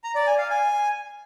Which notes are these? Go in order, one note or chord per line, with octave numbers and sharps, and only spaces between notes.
A#5
D5
G#5
F5
G#5